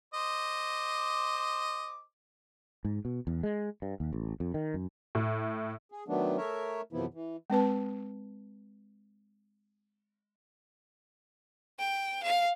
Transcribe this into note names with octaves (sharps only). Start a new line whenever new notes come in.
C5 D#5 D6
G#2
B2
E2
G#3
G2
D#2
A1
F2
D#3
F#2
A2
G#4
D#3 F#3 A3 B3 D4
A3 A#4 C#5 E5
F#2 C3 E3 F3 B3 E4
E3
G#3 C4 B4 A5
G5
F5